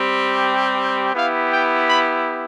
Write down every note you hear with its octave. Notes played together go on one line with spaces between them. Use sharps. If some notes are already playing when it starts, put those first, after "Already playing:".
Already playing: G3 C4 G4
B3 E4 G4 F5
G5
B5